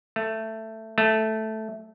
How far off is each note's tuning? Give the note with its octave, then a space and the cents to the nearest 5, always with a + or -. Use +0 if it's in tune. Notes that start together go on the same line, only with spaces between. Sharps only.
A3 +10
A3 -5